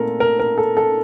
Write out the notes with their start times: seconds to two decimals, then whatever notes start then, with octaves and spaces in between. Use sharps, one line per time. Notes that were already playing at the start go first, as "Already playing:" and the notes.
Already playing: A#2 A3 C4 A4 A#4
0.20 A#4
0.40 A#4
0.58 A4
0.77 A4